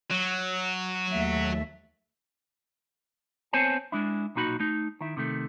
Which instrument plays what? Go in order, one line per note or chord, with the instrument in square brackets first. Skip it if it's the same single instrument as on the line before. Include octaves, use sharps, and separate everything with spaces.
[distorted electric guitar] F#3
[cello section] D#2 A3 E5
[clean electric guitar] B3 C4 C5 C#5 G#5 A5
G#3 D4 E4
B1 A#2 D#4 F#4 B5
A3 D#4
D#3 E4
C3 D#3 A3